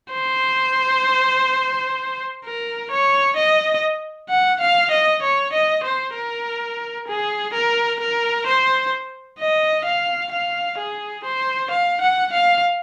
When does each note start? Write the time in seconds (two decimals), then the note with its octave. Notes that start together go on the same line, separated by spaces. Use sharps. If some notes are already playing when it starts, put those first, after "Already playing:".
0.13 C5
2.45 A#4
2.91 C#5
3.37 D#5
4.30 F#5
4.61 F5
4.91 D#5
5.23 C#5
5.53 D#5
5.84 C5
6.15 A#4
7.08 G#4
7.54 A#4
8.00 A#4
8.47 C5
9.39 D#5
9.85 F5
10.32 F5
10.78 G#4
11.25 C5
11.71 F5
12.01 F#5
12.33 F5